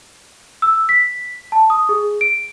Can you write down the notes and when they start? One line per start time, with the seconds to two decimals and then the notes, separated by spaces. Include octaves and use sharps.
0.62 E6
0.89 B6
1.52 A5
1.70 D#6
1.89 G#4
2.21 D7